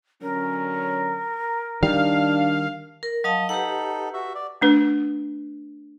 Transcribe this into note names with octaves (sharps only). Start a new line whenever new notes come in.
D3 F#3 C#4 A#4
D#3 G3 D4 F5
A#4
F#3 D#5 F5 A5
D#4 G4 A4 B4 F#5
F#4 E5
D5
A3 D4 B4